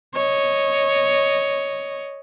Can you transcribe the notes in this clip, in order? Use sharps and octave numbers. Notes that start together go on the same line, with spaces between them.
C#5 D#5